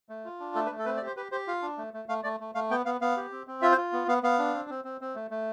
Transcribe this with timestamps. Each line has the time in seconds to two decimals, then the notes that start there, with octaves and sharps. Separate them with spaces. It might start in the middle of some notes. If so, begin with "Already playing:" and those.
0.09 A3
0.25 F4
0.40 D4
0.55 A3 A4
0.66 B4
0.71 A3
0.79 A4
0.85 C4 B4
0.97 D5
1.01 G4
1.07 C5
1.17 G4 B4
1.31 G4 C5
1.47 F4 F5
1.62 D4
1.77 A3
1.94 A3
2.09 A3 F5
2.24 A3 D5
2.40 A3
2.55 A3 F5
2.71 B3 G5
2.85 B3 F5
3.01 B3 F5
3.17 G4
3.32 C4
3.47 C4
3.62 F4 E5
3.72 C5
3.77 F4
3.93 B3
4.08 B3 F5
4.23 B3 F5
4.39 D4
4.54 C4
4.70 C4
4.85 C4
5.01 C4
5.15 A3
5.31 A3